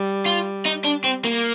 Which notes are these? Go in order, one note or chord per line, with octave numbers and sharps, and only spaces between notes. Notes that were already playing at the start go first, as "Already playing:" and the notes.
Already playing: G3
F4
D#4
D4
C4
A#3